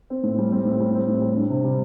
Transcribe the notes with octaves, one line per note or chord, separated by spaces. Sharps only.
C4
A2
G3
C4
A2
G3
C4
A2
G3
D4
C3
G3